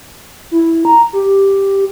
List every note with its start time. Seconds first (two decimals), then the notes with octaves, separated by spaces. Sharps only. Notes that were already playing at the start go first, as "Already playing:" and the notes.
0.51 E4
0.85 A#5
1.13 G4